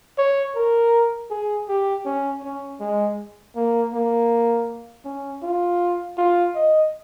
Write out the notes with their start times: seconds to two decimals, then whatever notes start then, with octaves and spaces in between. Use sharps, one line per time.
0.18 C#5
0.55 A#4
1.31 G#4
1.68 G4
2.05 C#4
2.43 C#4
2.80 G#3
3.55 A#3
3.93 A#3
5.05 C#4
5.43 F4
6.17 F4
6.55 D#5